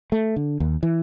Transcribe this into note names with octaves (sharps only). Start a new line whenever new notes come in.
A3
D3
D#2
E3